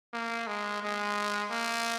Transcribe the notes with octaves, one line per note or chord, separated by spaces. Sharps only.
A#3
G#3
G#3
A#3